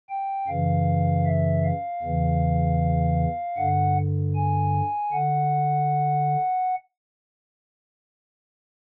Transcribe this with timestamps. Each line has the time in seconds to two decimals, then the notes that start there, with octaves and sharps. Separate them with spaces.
0.09 G5
0.47 F#2 C#3 E3 F5
1.26 E5
1.64 F5
2.03 E2 C#3 E3
3.57 G2 D3 F#5
4.35 G#5
5.13 D3 F#5